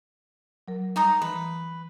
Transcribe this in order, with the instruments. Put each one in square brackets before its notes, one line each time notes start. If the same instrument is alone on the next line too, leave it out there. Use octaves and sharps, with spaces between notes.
[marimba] F#3 A#4
[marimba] G3 [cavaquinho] D#4 A#5 D#6
[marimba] E3 [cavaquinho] B4